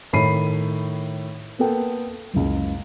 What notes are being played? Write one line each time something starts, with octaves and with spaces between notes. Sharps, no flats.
A2 D#3 B5 C7 D#7
A#3 B3 A4 G5
F#1 C#2